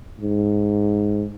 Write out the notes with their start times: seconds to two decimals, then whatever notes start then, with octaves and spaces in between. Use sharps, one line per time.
0.21 G#2